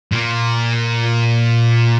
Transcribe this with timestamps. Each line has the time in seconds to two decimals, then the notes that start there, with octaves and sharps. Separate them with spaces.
0.12 A#2 A#3